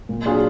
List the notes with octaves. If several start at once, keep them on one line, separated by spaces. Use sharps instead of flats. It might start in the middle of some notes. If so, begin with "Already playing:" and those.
A#2
F#3 D4 F4 G#4